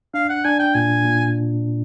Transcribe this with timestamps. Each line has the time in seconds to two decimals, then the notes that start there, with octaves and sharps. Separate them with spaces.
0.14 D4 F5
0.29 F#5
0.45 D4 G#5
0.59 G5
0.74 A#2 G#5
1.05 A#2